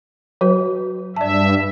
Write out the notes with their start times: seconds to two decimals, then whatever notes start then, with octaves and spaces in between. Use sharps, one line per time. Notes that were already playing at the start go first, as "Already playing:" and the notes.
0.41 F#3 F#4 B4
1.16 G2 D5 E5 A5